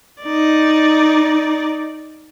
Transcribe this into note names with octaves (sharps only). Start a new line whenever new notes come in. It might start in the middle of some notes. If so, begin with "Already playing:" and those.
D#4 D5